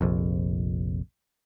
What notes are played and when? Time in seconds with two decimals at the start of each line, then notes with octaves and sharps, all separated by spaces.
0.01 F1 A#1 F2